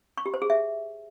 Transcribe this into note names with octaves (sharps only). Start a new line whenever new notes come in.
C#6
G4
C5
G#4
E5